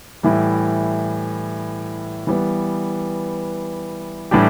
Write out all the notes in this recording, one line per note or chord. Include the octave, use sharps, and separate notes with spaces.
A2 E3 G3
E3 G3 B3
A2 E3 G3 D4 G4